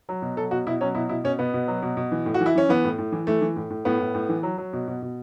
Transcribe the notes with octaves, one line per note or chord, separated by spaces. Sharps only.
F#3
B2
F#3 A4
B2 F#4
B2 E4
F#3 C#4
B2 E4
B2 E4
B2 C#4
B2 B3
B2
F#3
B2
B2
E3
A2
F#4
E3
E4
E3 C#4
E3 B3
A2
A2
E3
E3 A3
E3
A2
A2
A2 B3
A2
A2
E3
F#3
F#3
B2
B2
B2